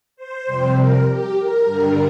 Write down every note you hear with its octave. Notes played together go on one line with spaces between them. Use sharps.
C5
F2 C3 G3
A#4
G4
A#4
G2 D3 G3